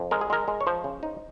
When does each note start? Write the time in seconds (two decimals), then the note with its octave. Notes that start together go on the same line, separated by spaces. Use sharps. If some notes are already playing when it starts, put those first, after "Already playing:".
Already playing: F2
0.11 G#3 A#4
0.21 G#4
0.30 G#3 A#4
0.48 G#3
0.61 C#5
0.67 F3 C5
0.84 C#3
1.03 D#4